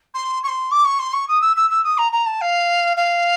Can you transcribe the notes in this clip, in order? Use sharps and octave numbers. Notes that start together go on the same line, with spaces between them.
C6
C#6
C6
D6
C#6
C6
C#6
D#6
E6
E6
E6
D#6
A#5
A#5
A5
F5
F5